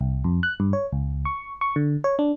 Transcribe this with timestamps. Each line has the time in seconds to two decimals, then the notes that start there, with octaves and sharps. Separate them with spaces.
0.01 C2
0.24 F2
0.43 F#6
0.60 G2
0.73 C#5
0.92 C#2
1.25 C#6
1.61 C#6
1.76 D3
2.04 C#5
2.19 D4